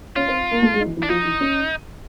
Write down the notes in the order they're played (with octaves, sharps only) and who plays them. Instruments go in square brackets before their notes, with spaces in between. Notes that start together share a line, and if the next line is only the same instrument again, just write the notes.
[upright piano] C#4 C#5 [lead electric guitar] F4
[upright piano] C4 C5
A#3 A#4
A3 A4
G#3 G#4
D#4
E3 E4
E3 E4
[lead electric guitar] D4
[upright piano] F3 F4 [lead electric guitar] D#4
[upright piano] E3 E4
C#4